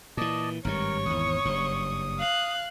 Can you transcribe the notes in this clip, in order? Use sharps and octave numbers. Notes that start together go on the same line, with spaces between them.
A#2 E3 D5 D#5 A5
G#1 G2 G3 A#4 C#5 C#6
G#1 E2 D#6
F#1 G2
F5 F#6